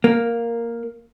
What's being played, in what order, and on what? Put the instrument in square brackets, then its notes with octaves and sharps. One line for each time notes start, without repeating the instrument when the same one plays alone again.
[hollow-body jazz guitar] A#3